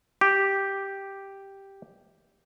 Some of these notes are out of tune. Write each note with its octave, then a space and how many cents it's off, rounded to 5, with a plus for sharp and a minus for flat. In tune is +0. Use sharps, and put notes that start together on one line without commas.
G4 +0